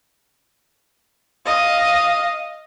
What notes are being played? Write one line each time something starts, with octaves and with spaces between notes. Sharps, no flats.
D#5 F5